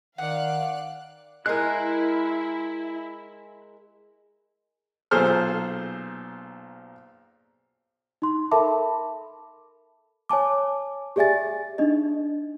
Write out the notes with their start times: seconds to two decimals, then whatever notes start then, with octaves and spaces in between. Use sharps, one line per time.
0.18 D#3 D5 F5 F#5 F#6
1.46 G#3 E4 A#4 G#5 C6 F#6
5.11 B1 A#2 G#4 A4 C5 F6
8.22 D#4 C6
8.51 A4 A#4 E5 A5 B5 D6
10.29 C#5 G#5 A5 D6
11.16 G4 G#4 D5 E5 G#5 A6
11.78 D4 D#4 D#5